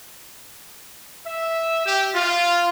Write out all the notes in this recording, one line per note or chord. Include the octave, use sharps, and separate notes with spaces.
E5
G4
F4